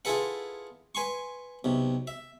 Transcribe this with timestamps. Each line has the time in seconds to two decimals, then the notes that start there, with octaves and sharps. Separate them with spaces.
0.05 E4 F4 G#4 A4 B4 F#5
0.95 B4 G#5 C6 C#6
1.64 B1 C3
2.07 E5